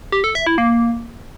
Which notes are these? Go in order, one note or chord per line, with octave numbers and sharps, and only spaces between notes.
G4
A4
E5
E4
A#3